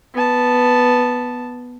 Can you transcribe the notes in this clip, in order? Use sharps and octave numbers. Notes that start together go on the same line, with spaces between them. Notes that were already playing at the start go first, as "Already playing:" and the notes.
B3 A5